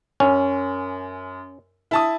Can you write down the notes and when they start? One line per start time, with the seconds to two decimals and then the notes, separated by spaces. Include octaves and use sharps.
0.20 F#2 C#4
1.91 E4 A5 D#6